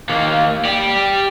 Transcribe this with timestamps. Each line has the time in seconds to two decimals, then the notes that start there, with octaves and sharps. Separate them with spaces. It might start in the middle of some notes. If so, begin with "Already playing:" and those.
0.09 D#2 A#3
0.65 G4 D5